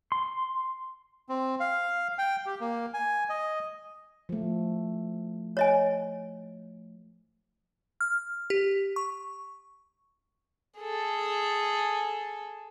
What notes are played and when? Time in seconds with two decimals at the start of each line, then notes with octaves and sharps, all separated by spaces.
0.12 C6
1.29 C4
1.60 F5
2.18 G5
2.46 G4
2.61 A#3
2.94 G#5
3.30 D#5
4.29 F3 A3
5.57 C#5 D#5 G#5
8.01 F6
8.50 G4
8.96 C#6
10.78 G#4 A4